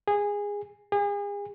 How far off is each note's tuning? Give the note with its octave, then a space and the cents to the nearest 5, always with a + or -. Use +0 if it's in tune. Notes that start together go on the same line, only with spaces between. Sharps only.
G#4 -15
G#4 -35